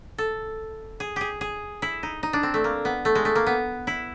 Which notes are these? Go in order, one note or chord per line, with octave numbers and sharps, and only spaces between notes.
A4
G#4
G4 G#4
G#4
E4
D#4
D#4
D4
C4
A3
A#3
B3
A3
G#3
A3
A#3
B3
E4